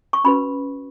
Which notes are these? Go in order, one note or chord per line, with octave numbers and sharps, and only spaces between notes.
C#6
C#4 F#4 B4 B5